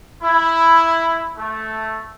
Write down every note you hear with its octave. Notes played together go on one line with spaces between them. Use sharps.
E4
A3